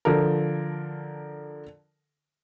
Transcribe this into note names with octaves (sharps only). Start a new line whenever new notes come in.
D3 F3 A4 A#4